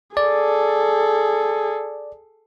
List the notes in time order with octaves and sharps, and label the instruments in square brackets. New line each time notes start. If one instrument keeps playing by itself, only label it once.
[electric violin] G#4 A4 [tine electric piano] D5